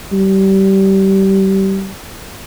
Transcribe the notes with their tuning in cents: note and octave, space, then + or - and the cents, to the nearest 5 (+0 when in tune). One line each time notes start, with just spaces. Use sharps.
G3 -25